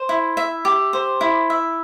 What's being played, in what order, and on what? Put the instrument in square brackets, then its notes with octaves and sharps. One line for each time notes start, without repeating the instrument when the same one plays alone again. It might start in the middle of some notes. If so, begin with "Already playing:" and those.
Already playing: [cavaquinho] C5
E4
E5
G4
C5
E4
E5